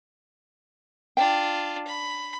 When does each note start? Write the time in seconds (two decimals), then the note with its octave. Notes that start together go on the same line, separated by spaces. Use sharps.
1.17 D4 F4 G5
1.87 B5